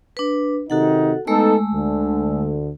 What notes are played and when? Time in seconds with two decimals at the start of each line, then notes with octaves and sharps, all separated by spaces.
0.17 D4 B4
0.70 C3 D#3 D#4 F#4 A4 F#5
1.27 G#3 A3 B3 D#4 A4 E6
1.74 D2 D3